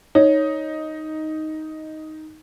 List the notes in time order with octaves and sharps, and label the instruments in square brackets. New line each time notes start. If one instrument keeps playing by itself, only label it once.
[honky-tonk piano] D#4 [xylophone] C#5